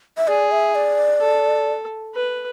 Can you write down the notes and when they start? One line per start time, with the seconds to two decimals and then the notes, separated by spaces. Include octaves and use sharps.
0.17 E5
0.28 G#4 D5
0.51 E5
0.75 D5
1.21 A4
2.15 B4